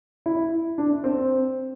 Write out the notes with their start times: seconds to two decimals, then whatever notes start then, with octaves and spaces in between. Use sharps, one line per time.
0.26 E4
0.78 D4
1.04 C4